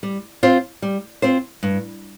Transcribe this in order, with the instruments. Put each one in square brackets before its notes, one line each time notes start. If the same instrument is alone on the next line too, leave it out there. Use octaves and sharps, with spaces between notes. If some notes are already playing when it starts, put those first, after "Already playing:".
[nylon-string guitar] G3
C4 F4 C5
G3
C4 F4 C5
G2